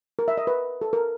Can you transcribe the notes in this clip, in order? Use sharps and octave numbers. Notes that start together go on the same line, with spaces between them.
A#4
E5
D#5
B4
A4
A#4